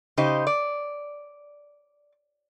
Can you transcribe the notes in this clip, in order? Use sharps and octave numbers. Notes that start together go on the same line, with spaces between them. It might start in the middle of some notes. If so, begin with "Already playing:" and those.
C#3 D#4 G4 C5 D#5
D5